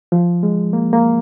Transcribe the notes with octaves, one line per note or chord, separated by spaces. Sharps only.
F3
G#3
A#3
A#3